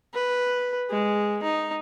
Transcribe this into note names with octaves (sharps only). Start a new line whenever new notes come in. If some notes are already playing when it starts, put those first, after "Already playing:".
B4
G#3
D#4